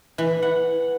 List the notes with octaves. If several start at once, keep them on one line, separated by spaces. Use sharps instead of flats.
E3
F#5